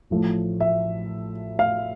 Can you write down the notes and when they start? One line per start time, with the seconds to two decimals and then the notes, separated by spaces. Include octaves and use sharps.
0.10 A1 A2 F3 A3
0.60 E5
1.59 F5